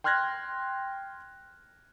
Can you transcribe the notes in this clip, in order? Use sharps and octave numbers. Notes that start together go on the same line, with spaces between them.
G5 C6 F6 F#6 G#6 A#6